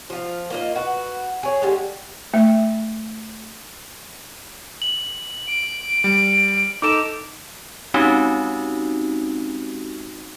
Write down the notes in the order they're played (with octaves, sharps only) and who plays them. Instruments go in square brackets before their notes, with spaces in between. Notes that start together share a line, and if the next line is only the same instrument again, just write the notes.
[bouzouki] F3 F4
A#3 F4 D#5
F#4 B4
G#4 C#5
D3 G3 G#3
[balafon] A3 E5
[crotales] F#7
[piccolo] D7
[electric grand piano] G3
[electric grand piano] D#4 A4 [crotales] D6 E7 [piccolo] D7
[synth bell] G#3 C4 C#4 D#4 F#4 G4